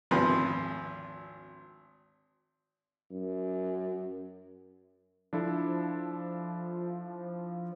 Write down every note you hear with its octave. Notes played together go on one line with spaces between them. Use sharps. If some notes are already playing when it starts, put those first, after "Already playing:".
G#1 D2 F3 C4 B4
F#2
F3 D4 E4 A4